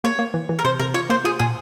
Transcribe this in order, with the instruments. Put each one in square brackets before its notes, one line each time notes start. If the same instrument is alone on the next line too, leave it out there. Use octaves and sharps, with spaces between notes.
[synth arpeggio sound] A#3 [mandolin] C#5
[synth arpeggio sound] A#3
E3
E3
[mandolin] A#4
[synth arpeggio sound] C3 [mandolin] C5
[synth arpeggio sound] C3 [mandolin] A#4
[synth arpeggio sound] F4 [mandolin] C#5
[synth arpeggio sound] A#3 [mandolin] C5
[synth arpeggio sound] F4 [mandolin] G#4
[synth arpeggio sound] A#2 [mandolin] G#4